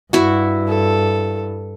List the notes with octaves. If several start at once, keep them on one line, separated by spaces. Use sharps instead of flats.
G2 E4 F#4
A4